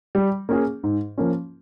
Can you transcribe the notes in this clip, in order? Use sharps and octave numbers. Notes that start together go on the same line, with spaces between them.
G3
A#3 C#4 G#4
G#2
F3 A#3 C#4